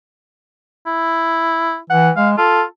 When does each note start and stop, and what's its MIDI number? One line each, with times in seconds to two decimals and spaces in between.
0.86 1.78 64
1.90 2.11 52
1.90 2.10 78
2.17 2.37 56
2.17 2.30 77
2.38 2.63 65
2.38 2.62 69